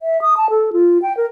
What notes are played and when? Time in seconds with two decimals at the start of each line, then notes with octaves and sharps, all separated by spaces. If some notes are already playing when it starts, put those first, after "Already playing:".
0.01 E5
0.22 D#6
0.37 A5
0.50 A4
0.73 F4
1.02 G5
1.17 A#4